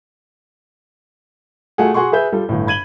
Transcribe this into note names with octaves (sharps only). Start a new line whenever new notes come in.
A3 F4 F#4 G#4 F#5
F#4 G#4 F#5 C6 C#6
G#4 B4 E5 G6
G3 F4 A4
G1 A2
B5 G#6 D#7 F#7 G7